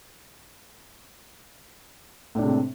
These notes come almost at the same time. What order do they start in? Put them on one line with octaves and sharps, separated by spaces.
A2 D4 C3 G#3 C4